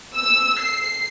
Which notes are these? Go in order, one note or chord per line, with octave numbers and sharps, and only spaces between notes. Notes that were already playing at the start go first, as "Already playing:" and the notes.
E6
C7